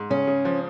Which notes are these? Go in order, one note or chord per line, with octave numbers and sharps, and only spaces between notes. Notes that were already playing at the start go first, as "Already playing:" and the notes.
Already playing: G#2
C#3 C#4
C#3
F3